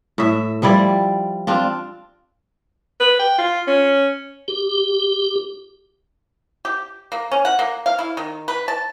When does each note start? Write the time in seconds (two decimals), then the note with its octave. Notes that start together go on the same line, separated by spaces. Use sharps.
0.18 A2 E5
0.62 F3 G3 E4 D5
1.47 C4 D4 F4
3.00 B4
3.19 G5
3.39 F4
3.67 C#4
4.48 G4
6.65 G4
7.12 A#3
7.32 C#4
7.45 F#5
7.59 A#3
7.86 F5
7.99 E4
8.17 D#3
8.48 B4
8.68 A5